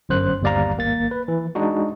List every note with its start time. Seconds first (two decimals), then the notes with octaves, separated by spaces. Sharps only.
0.09 G1 F#2 C5 F#6
0.42 G1 D#2 G3 D5 F5 A#5
0.77 G#1 A#3 A6
1.11 B4
1.28 E3
1.55 G#3 D4 D#4 F#4